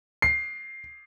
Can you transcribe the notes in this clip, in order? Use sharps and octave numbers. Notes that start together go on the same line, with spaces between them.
C7